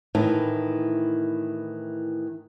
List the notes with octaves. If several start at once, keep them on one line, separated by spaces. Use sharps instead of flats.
A2 D#3 E3